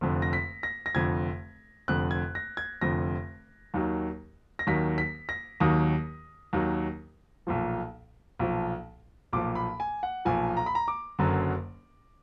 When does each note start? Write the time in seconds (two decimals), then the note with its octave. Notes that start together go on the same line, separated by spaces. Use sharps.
0.01 F1 F2 D3
0.22 A#6
0.33 B6
0.63 A#6
0.86 A#6
0.95 F1 F2 D3 G#6
1.88 F1 F2 D3 F#6
2.11 G#6
2.35 A#6
2.57 G#6
2.81 F1 F2 D3 A#6
3.74 D#2 D#3 F#3
4.59 A#6
4.67 D#2 D#3 F#3 B6
4.98 B6
5.29 A#6
5.60 D#2 D#3 F#3 D#6
6.53 D#2 D#3 F#3
7.47 B1 A#2 F3
8.39 B1 A#2 F3
9.33 B1 A#2 F3 D6
9.55 B5
9.80 G#5
10.03 F#5
10.25 B1 A#2 F3 G#5
10.57 A#5
10.66 B5
10.75 A#5
10.88 D6
11.19 F#1 F#2 D3 F#3